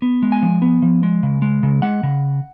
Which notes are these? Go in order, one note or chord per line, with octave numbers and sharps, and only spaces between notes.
B3
G#3
G#5
F3
B3
F3
G#3
C#3
G#3
C#3
G#3 F#5
C#3